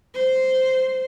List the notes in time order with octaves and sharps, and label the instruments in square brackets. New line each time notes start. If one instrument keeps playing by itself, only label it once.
[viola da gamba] C5